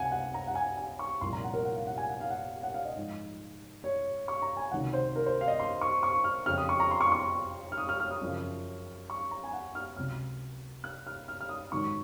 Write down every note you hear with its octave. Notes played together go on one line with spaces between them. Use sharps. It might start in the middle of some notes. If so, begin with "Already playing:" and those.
Already playing: C#2 C3 F#5 G#5
F#5
A#5
F#5
G#5
G#5
C#6
C2 A#2 F3 C6
A#5
F#5
A#4
F#5
F5
F#5
G#5
F#5
F5
F#5
F#5
F5
D#5
G#2 F3
C#5
C#6
A#5
G#5
C#2 C3 D#3 F#3 F#5
C5
A#4
C5
F5
D#5
C6
C#6
C#6
F6
F2 C#3 F3 F6
D#6
C#6
A#5
C6
C#6
C6
C#6
F6
D#6
F6
F6
D#6
F#2 C#3 F3
C#6
A#5
G#5
F#5
F6
C#2 C3 F#3 F6
F#6
F6
F6
F6
D#6
G#2 D#3 F#3 C#6